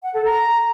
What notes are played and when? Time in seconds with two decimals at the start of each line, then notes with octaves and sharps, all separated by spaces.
0.03 F#5
0.13 A4
0.24 A#5